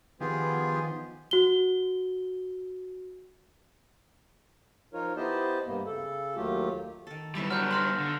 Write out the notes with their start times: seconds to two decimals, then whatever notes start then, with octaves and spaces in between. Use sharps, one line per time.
0.20 D#3 F3 B3 F4 G4 G#4
1.31 F#4 G7
4.93 F3 D#4 F4 A#4 C#5
5.16 B3 E4 G4 C5 D#5 A5
5.67 G2 C3 A#3 B3
5.86 C#3 A4
6.36 D#2 F#3 A3 F4 G4
7.07 D#3 A4
7.35 G3 B3 E4 E5 C#6
7.50 F#3 D4 D#4 F6 G6
7.71 A4 F5 F#5 C6 F6 A#6
7.98 D3